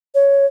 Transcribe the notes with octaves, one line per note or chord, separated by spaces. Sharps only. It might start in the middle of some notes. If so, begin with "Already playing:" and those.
C#5